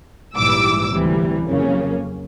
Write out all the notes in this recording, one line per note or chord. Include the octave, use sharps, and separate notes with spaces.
A#1 G#2 E3 G3 D6 E6
D2 C3 E3 G3
F2 C#3 F#3 A#3 C#4